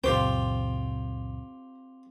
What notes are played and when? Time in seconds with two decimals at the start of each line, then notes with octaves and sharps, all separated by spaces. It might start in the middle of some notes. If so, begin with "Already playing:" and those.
0.04 C#2 F#2 A#2 C4 F4 G4 C5 G5